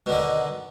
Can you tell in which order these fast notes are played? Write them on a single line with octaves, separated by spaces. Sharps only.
B2 D3 D#3